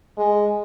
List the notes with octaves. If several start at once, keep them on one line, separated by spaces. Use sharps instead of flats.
G#3